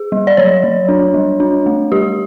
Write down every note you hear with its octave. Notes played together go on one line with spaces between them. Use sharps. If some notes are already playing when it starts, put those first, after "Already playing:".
Already playing: G#4
G3
D5
F#3 C#5
F#3
D4
G3
D4
A3
G3 G4